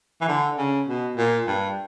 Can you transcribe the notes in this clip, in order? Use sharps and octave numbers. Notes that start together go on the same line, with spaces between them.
E3
D3
C#3
B2
A#2
G2